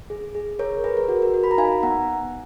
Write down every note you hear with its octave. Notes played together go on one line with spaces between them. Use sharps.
G#4
G#4
G#4 A#4 C#5
G#4 B4
A#4
F#4
A#4
F#4
B5
A#5
D#4 F5 G#5
B3 F#5 A#5